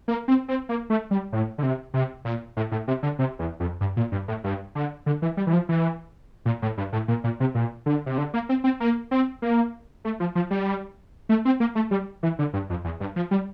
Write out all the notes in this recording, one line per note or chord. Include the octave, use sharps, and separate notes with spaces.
A#3
C4
C4
A#3
A3
G3
A2
D3
C3
C3
A#2
A2
A2
C3
D3
C3
E2
F2
G2
A#2
G2
A2
G2
D3
D3
E3
G3
E3
F3
E3
A#2
A2
G2
A2
A#2
A#2
C3
A#2
D3
C3
D3
A#3
C4
C4
A#3
C4
A#3
A3
F3
F3
G3
A3
C4
A#3
A3
G3
E3
D3
G2
F2
E2
G2
F3
G3